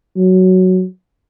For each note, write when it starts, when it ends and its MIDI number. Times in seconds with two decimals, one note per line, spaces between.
0.17 0.84 54